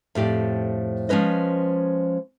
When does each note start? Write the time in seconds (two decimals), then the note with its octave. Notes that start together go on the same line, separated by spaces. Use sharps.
0.15 F2 A2 G4 D5
1.09 F3 G#3 C#4 B4 D#5